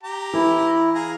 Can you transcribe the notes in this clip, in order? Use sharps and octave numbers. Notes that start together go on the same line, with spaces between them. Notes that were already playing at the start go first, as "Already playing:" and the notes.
G4 A#5
E3 E4
G#4 F5 A#5